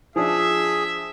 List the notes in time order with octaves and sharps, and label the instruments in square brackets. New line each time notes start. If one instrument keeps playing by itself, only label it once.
[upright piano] F3 D4 [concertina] G#4 [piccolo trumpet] E5